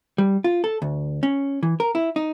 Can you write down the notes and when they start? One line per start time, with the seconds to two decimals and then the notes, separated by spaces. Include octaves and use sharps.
0.18 G3
0.44 F4
0.64 A4
0.82 D2
1.23 C#4
1.63 E3
1.80 A#4
1.95 E4
2.16 D#4